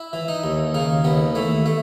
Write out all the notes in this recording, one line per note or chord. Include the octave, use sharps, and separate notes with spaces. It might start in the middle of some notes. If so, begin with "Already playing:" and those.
Already playing: E4
E3
D#4
D#2
C#3 D#4
D#2 B3
E3 A3
A3